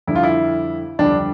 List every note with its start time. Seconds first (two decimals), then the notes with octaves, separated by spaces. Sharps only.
0.07 F2 D3 G3 E4
0.15 F4
0.23 E4
0.99 F2 D3 G3 D4